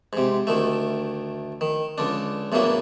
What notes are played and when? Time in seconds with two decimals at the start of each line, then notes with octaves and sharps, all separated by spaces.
0.13 G#2 C3
0.47 D2 D#3 A3
1.61 D#3
1.98 C#2 D3 D4
2.52 E2 A2 E3 F#3 A#3 D4